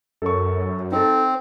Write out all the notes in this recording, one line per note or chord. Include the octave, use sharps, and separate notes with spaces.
F#2 A4 A#4 C#6
C4 D#4 A4